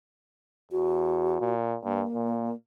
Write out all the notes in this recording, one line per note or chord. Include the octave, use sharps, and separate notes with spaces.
E2 F#4
A#2
G2 A#3
A#2